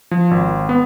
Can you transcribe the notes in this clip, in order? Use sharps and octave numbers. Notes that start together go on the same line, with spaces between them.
F3
G#1
B3